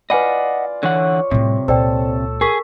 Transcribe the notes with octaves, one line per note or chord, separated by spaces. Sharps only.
F4 B4 D5 D#5 F#5 G#5 B5
D3 E3 C#5 F#5
A2 C3 G3
C#2 A#2 A4 C5 D5 G5
G#4 A#4 C#6 B6